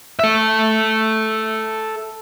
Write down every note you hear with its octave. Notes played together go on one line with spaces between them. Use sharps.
A4 E5